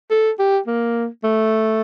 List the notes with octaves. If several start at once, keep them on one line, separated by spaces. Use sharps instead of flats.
A4
G4
A#3
A3